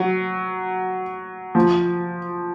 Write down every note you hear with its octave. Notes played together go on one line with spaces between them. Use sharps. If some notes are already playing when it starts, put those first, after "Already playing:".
Already playing: F#3
F3